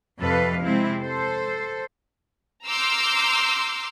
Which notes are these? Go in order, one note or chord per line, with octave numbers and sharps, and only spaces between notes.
F2 C3 A4 B4 F5
C3 G#3 C4 E4
A4 C5
A#5 C6 D6 E6 F6 G6